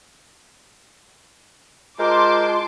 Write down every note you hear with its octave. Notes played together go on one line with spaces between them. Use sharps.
G#3 F4 A#4 C5 A5 C6 D6